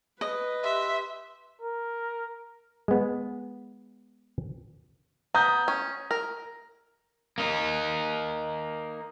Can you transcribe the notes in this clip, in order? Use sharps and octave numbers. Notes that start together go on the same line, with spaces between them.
B4 D#5
G4 E5 C6
A#4
G#3 B3
B3 A#5 D#6 G6
C#4
A#4
A#3 D#4